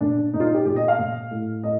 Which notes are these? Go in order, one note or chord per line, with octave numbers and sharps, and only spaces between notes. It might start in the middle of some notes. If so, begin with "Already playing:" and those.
A#2 D4
A#2 D#4
F4
D#4
G4
A#2 G4
D#5
F5
A#2
A2
A2 D#5